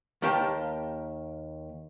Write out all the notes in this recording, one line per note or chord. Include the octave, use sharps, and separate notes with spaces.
D#2 A#3 G4 G5 A5